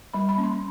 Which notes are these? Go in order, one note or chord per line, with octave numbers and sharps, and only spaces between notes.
G3 B5
B5
A#3 C#4
C6